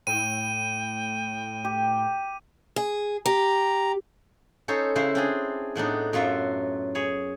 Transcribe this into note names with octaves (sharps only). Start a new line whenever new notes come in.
A2 G5 D#7
G4
G#4
G4 A#5
C#4 D#4 A4 C5 C#5
C#3 C#4 E4 B4 C5
C4 D4 G#4
A2 B3 D4 D#4
F#2 F#3 F4 B4 E5
G#4 C#5 B5